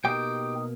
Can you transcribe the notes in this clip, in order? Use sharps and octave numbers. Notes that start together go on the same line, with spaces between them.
B2 A#3 D#4 G4 G5